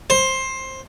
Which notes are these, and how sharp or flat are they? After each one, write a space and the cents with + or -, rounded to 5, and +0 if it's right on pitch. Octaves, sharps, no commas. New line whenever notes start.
C5 +15